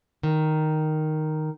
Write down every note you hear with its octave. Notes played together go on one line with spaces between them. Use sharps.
D#3